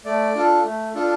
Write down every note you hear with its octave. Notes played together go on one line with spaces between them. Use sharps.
A3 D5
D4 F4 A4
A3
D4 F4 A4